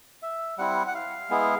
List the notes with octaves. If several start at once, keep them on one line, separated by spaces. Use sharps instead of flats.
E5
G3 C4 E4 F#5
F#5
F5
G#3 B3 E4